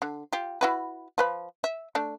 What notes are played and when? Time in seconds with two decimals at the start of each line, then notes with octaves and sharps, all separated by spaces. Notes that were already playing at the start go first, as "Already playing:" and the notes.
0.02 D3
0.33 F4 G4
0.61 E4 F#4 B4
1.18 F3 B4 B5
1.64 E5
1.95 A3 D4